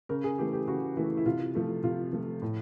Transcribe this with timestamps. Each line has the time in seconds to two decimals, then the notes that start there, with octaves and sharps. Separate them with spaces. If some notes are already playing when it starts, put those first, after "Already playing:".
0.09 C#3 A#4
0.24 G#4
0.38 E3 A3 G4
0.53 G4
0.68 C#3 F#4
0.97 E3 A3 E4
1.17 E4
1.26 C3 F4
1.55 F3 A3
1.84 C3 F4
2.13 F3 A3
2.42 A2